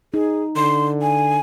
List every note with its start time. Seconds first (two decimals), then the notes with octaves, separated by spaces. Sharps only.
0.14 D#4 G#4
0.56 D3 C6
1.02 G#5